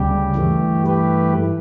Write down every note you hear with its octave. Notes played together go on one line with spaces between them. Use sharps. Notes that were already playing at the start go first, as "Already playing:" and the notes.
Already playing: D2 C#3 G3 G4
G2 E3 A3
G4 B4